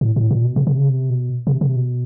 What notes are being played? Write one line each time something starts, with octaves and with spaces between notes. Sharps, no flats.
A2
A2
A#2
B2
C3
C3
C#3
C3
B2
C3
C3
B2